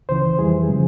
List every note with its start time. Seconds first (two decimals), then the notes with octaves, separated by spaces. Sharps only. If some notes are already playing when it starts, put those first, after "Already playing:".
0.09 C#2 C#3 E3 C5
0.39 F2 E3 G3 G#4
0.68 C#3 F3 G#3